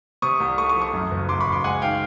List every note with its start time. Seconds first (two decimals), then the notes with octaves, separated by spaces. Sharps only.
0.22 C3 C#6 D#6
0.40 C2
0.58 A3 C#6 D#6
0.69 C#6 D#6
0.76 F3
0.81 C#6 D#6
0.93 F#2
1.11 F#1
1.29 F#2 C6 D6
1.40 B5 C#6
1.46 F#1
1.52 C6 D6
1.64 G#3 F#5 G#5
1.82 D#3 F5 G5